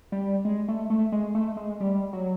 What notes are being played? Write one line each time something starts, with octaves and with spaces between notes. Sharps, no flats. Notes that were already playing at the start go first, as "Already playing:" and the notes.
G3
G#3
A3
A3
G#3
A3
G#3
G3
F#3